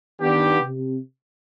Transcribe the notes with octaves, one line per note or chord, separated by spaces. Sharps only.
D#3 B3 D4 G4
C3